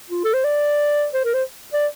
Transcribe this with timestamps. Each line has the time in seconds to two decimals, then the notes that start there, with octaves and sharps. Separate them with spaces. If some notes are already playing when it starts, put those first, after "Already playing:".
0.10 F4
0.24 A4
0.34 C5
0.44 D5
1.14 C5
1.25 A#4
1.34 C5
1.73 D5